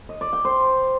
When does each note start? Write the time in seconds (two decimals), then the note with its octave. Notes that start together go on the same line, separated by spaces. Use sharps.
0.09 D#5
0.21 D5
0.33 G5
0.45 C5